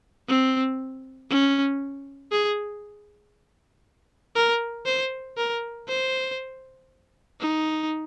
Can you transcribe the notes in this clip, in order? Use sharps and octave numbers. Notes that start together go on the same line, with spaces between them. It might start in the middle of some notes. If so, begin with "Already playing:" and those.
C4
C#4
G#4
A#4
C5
A#4
C5
D#4